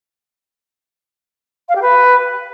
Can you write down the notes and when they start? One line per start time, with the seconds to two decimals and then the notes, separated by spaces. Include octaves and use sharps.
1.69 F5
1.75 G4
1.82 B4